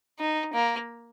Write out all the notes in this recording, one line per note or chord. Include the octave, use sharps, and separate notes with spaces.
D#4
A#3